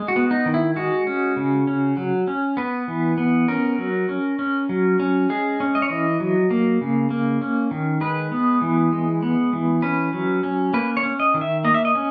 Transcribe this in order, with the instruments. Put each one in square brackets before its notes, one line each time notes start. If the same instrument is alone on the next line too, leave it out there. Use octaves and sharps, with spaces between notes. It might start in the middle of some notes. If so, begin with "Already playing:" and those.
Already playing: [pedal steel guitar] G#3
F#4
B3
D#4
D#3
E4
G#3 F#4
C#4
C#3
C#4
F#3
C#4
B3 B4
E3
B3
C#4 A#4
F#3
C#4
C#4
F#3
C#4
G#3 G#4
C#4
D#5
C#5
E3 D#5
F#3
A#3
C#3
A#3
C#4
D#3
G#3 B4
B3
E3
G#3
B3
E3
C#4 B4
F#3
C#4
A#3 B4
C#5
C#4
D#5
D#3
E5
A#3 D#5
E5
D#5
C#4